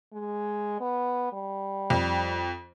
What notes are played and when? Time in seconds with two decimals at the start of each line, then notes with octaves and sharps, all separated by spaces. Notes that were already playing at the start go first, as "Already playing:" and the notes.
0.13 G#3
0.81 B3
1.33 G3
1.90 F2